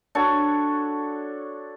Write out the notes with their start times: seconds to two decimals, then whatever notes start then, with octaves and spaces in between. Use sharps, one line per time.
0.15 D4 F#4 A4 C#5